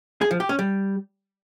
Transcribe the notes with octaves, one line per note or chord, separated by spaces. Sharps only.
G#4
F3
G4
C#4
G3